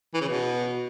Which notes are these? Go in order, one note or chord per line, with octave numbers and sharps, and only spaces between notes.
E3
C#3
B2